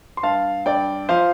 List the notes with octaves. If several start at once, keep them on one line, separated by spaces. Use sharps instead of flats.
C6
G2 F5 A5
G2 D5 G5
F3 C5 F5